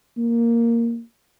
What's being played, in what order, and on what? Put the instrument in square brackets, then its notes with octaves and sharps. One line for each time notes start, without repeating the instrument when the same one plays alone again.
[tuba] A#3